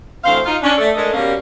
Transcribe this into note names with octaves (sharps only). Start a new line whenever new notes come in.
D2 E3 C4 C5 F5
D#4 F4
C#4 D4
A3 A4 D5
G#3 A3 D4 A4 A#4 D#5
B2 G3 A#3 C#4